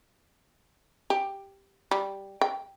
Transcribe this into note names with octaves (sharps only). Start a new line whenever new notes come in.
G4
G3
G5